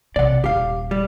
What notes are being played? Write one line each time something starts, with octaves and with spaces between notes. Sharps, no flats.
B1 C3 D5 F#5
D#1 G4 F5
G3